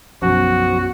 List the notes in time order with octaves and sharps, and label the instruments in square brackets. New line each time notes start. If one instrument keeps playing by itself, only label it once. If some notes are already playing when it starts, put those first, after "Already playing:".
[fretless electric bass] B1 F#2 [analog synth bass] F3 [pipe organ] F#4